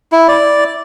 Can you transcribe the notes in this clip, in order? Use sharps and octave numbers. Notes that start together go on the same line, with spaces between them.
E4
D5